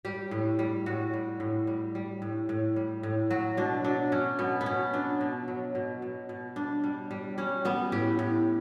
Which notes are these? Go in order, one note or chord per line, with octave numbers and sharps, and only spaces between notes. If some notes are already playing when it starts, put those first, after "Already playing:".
G3 G4
A2
G3
A2 F#4
G3
A2
G3
G3
A2
A2
G3
A2
F#3 F#4
B2 D4
F#3 D4
F#3 C#4
B2 B3
B3
B2 C#4
F#3 D4
B2
F#3
B2
B2
B2
G3 D4
G3
G3
G3 C#4
G3 B3
A2 G4
A2